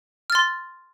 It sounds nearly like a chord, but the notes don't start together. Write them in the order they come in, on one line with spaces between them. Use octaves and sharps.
F6 A6 C6